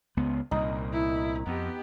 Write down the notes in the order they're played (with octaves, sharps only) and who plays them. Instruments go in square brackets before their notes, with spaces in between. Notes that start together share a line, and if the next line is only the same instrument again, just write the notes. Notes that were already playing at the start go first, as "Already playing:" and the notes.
[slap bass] C#2 B3
[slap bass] C2 A#2 [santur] D#4
[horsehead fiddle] E4
[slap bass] F2 [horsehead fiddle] B3 G4